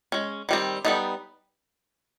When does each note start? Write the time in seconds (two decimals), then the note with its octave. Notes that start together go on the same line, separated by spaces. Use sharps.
0.12 G#3 C#4
0.49 D#3 G3 C4
0.85 G3 B3 D#4 A4